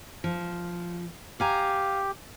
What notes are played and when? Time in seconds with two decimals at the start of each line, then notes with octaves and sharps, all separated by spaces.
0.24 F3
1.40 G4 F5 G#5 A#5